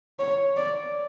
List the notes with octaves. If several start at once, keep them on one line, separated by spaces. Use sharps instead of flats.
C#5
D5